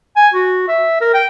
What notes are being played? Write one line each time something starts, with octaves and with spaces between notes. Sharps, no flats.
G#5
F#4
E5
A#4
G5